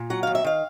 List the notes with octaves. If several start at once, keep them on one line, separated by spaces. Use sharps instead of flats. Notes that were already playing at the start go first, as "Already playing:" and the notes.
Already playing: A#2
F#3 F#5
D#2 F5
E5
D#3 F5